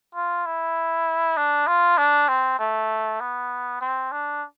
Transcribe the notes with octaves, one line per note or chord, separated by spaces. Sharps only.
F4
E4
D4
F4
D4
C4
A3
B3
C4
D4